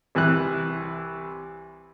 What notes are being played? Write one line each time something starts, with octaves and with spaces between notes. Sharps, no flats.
C2 E3 E4 F#6